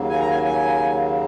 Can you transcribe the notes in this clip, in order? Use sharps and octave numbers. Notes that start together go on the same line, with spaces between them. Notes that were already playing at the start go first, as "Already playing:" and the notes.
Already playing: D#2 C#3 F#3 A#3
G#5
A#5
G#5
G#5